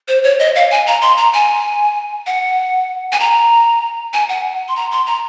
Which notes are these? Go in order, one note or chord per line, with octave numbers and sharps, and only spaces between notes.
C5
C#5
D#5
F5
G#5
A#5
C6
A#5
G#5
F#5
G#5
A#5
G#5
F#5
C6
A#5
C6
A#5